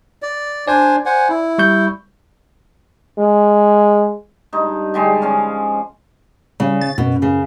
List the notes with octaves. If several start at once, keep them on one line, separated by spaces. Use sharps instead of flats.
D5
D4 C5 D5 G#5
C5 F#5 G#5
E4
G3 C#6 G6
G#3
G2 D#4
D3 G3 G#3
F3 C#4 F5
C#3 G3
A6
F#2 B2
C#3